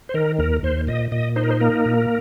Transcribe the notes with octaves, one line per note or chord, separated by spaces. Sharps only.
C5
D#3 A#4
D#2 A#4
D#2 C5
A#2 D#5
A#2 D#5
D#4 C5
A#4
C5
A#3 A#4
A#2